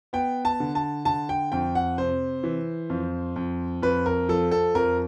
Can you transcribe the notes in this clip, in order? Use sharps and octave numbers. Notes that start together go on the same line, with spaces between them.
B3 G5
A5
D3
A5
D3 A5
G5
F2 G5
F#5
C3 C5
E3
F2
F2
F2 B4
A#4
F3 A4
A4
F2 A#4